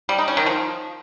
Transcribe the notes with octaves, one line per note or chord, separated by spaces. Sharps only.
G3
D#4
C#4
D#3
F3